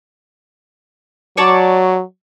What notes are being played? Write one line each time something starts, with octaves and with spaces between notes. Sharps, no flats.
F#3 C#5 D5 A5